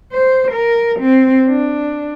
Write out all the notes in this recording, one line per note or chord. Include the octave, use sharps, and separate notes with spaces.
C5
A#4
C4
D4